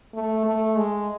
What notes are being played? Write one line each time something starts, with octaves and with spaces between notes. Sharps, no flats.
A3
A3
G#3